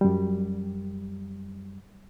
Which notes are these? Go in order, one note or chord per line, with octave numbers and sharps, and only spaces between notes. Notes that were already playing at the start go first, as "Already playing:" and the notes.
F#2 G3